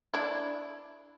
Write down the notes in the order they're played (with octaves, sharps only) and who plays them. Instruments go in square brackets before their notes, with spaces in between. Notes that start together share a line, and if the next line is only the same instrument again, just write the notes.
[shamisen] D4 E4